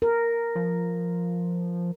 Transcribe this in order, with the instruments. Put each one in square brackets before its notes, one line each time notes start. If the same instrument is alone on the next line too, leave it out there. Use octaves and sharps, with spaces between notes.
[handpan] A#4
[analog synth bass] F3